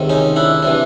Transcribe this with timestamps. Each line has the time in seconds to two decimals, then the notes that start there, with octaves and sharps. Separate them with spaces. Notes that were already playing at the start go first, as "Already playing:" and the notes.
Already playing: C#2 C3 D#3
0.09 C#4 D#4
0.36 D4 E4
0.62 C3 E3 D4